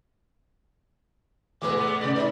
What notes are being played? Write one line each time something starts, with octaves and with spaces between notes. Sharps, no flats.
A1 E2 E3 G#3 B3 B4 D6
G#3 B3
C3 D5
D#4 D5